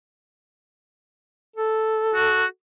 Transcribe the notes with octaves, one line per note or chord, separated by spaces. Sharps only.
A4
F#4